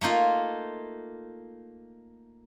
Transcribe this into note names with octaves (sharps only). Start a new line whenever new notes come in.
A3 A#3 D#4 F4